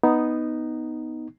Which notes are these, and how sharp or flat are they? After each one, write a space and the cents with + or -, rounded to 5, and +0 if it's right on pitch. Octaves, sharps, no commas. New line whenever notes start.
B3 +0 D#4 +0